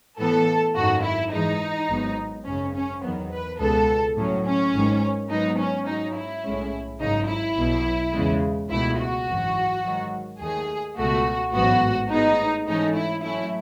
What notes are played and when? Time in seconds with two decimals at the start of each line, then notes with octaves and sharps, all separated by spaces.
0.19 A2 E3 B3 A4
0.75 G#1 F#2 D#3 F#4
1.04 E4
1.32 G#2 E3 G#3 D#4
1.89 G#1 G#2 F#3 B3
2.46 G#1 F#2 C#3 C#4
2.74 C#4
3.03 E2 D#3 F#3 B3
3.31 B4
3.59 C#2 B2 G#3 B3 A4
4.16 A2 F#3 C#4
4.45 C#4
4.73 G#1 G#2 D#3
5.30 G#2 F#3 B3 D#4
5.58 C#4
5.87 G#2 F#3 C#4 D#4
6.15 E4
6.43 B1 A2 G#3 C#4
7.00 G#1 F#2 C#3 D#4
7.28 E4
7.57 B1 B2 F#3
8.14 E2 C#3 G#3
8.70 C#2 B2 A3 E4
8.99 F#4
9.27 G#1 F#2 E3
9.84 G#2 D#3 F#3
10.40 D#2 D#3 A3 G#4
10.97 C#2 B2 A3 F#4
11.54 A1 G#2 F#3 B3 F#4
12.10 A2 G#3 B3 D#4
12.67 G#2 E3 A3 C#4 D#4
12.96 E4
13.24 A2 F#3 A3 C#4 E4